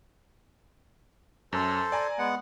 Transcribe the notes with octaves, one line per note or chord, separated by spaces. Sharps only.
F#2 A4 C5
D5 G#5 A#5
G#3 B3 F#5